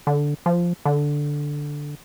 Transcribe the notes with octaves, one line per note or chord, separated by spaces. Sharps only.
D3
F3
D3